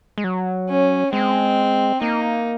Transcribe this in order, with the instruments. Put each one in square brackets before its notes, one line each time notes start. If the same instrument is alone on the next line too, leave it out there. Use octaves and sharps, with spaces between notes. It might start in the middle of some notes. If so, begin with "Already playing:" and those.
[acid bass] G#3
F#3
[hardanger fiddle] C#4
[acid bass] G#3 [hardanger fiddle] C4
[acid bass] A#3 [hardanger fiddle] D#4